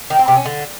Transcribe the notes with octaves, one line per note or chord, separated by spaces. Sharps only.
D#3
C4
C3
C#4
D3